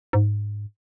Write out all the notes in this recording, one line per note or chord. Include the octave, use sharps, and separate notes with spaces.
G#2